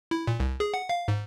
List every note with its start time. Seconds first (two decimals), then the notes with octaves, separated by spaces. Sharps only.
0.11 E4
0.27 A#2
0.40 C2
0.60 G#4
0.74 F#5
0.89 F5
1.08 G#2